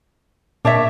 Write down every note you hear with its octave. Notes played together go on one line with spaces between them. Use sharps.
A#2 D4 C#5 E5